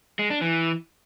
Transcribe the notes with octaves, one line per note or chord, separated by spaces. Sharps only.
G#3
D4
E3